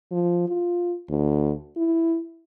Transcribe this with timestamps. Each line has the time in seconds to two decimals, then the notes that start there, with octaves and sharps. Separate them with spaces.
0.11 F3
0.48 F4
1.09 D2
1.76 E4